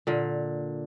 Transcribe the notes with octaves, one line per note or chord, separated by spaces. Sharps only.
A#2 D3